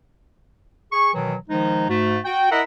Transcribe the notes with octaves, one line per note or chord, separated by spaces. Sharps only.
G#4 C#6
B2 D#3 E3 F#3
D#3 F3 G#3 D#4
G#2 A3 F#4
F#4 G5
E4 A#4 D#5 E5 F#5